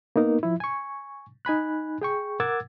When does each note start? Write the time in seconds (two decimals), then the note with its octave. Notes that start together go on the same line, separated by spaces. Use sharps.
0.16 A#3 B3 D#4 A#4
0.43 F3 E4
0.60 G#5 C#6
1.45 D#4 G#5 B5 F#6
2.02 G#4 G5 C#6
2.40 A#4 F#5 D6 E6 G#6 A6